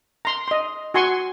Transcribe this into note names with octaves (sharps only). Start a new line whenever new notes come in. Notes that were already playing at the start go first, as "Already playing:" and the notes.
A#5 C6
D#5 C6
F#4 G#5 C6 C#6